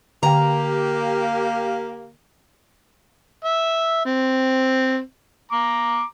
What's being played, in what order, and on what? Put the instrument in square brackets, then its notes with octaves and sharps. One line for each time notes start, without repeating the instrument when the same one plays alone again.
[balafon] D3 G5 [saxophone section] A#3 G4 [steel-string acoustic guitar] A#5
[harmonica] E5
C4
A#5 D6